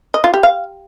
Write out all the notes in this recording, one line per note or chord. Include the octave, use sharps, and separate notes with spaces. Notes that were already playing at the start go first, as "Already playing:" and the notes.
D#5
F4
G4
F5